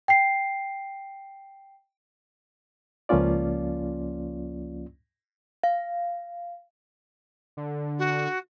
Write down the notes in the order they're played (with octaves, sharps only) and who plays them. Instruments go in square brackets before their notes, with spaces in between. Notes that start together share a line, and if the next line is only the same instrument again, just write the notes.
[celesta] G5 C7
[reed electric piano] C#2 F3 A#3 C#4 F4 D5
[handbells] F5
[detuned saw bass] D3
[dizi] F#4